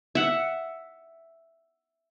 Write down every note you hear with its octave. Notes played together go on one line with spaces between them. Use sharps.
E5 F#5